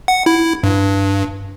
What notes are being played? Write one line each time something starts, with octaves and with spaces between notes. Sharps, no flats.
F#5
E4
G2